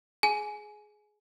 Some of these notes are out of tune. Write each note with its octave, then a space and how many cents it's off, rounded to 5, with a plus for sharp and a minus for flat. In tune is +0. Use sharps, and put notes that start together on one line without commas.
G#4 +15 G#5 +15